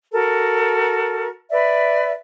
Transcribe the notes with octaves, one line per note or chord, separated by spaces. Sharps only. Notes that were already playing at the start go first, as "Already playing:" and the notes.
F#4 A4 A#4
B4 D5 E5